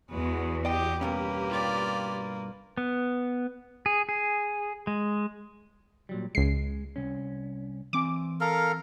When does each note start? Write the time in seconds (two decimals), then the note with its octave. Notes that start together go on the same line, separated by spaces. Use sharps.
0.11 E2 G#3 F#4 B4
0.65 G4 D5 D#5 G5
1.01 G2 B2 A#3 C#4 G4 B4
1.50 F4 D5
2.77 B3
3.86 G#4
4.09 G#4
4.87 G#3
6.09 A#2 F#3 G3
6.35 C#2 G#3 C7
6.96 C2 C#4
7.93 E3 C4 G#5 D6
8.41 A4 A#4 F5